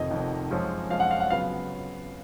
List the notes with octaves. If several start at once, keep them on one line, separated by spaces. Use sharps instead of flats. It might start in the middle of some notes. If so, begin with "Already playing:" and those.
Already playing: F1 F2 D#3 D#5
F1 F2 D#3
F#2 F3 G#3 C#4
F#2 F3 G#3 C#4 F5
F#5
F5
F#5
C#3 F#3 B3 F5